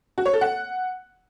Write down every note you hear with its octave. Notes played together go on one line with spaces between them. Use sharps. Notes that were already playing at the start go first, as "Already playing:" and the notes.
F#4
C#5
A4
F#5